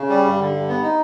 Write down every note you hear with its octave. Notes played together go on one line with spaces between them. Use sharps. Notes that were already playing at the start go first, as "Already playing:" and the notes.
Already playing: C#3
G3
G2
D3
G2
B3
D#4